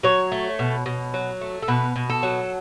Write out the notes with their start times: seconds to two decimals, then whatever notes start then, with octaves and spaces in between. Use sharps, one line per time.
0.03 F#3 C#5
0.32 A3
0.59 B2
0.86 B2
1.14 F#3
1.41 A3
1.62 A4
1.68 B2 B4
1.96 B2
2.10 A4
2.23 F#3